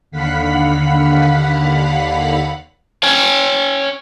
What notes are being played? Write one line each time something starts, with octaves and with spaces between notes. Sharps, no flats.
D#2 D3 F5 F#5 B5 B6
C#5 G5 G#5